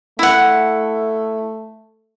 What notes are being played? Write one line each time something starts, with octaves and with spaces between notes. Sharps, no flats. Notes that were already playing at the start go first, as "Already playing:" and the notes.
A3 E4 F#5